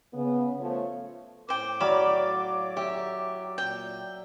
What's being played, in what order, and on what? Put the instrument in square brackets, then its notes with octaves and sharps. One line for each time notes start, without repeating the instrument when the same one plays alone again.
[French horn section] C#3 B3
F3 A3 C#5
[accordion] A2 D6 [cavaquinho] C5 G5
[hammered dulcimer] F#3 D5 [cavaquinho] E5 F5 B5
[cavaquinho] G4 [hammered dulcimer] E5
[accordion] A#2 [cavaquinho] G5